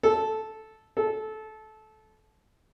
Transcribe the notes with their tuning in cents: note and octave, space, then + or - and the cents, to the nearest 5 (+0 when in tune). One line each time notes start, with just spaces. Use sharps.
A4 -10
A4 -20